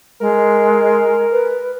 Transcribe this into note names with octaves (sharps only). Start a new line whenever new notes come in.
G#3 A#4
B4